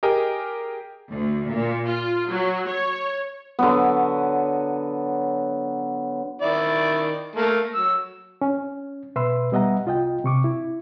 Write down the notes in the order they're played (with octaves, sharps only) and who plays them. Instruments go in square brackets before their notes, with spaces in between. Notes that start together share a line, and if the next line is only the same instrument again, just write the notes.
[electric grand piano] G4 G#4 A#4 D#5 G5
[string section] D2
A#2
F4
F#3
C#5
[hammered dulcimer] D3 F#3 B3
[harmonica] D#3 E4 D5
A3 A#3
F#3 E6
[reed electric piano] C#4
B2 B4 E5 C6 E6
G3 B3 D#5 E5 F#5 A#5
C2 F4 D#5 G5
C3 C#6 D6
E4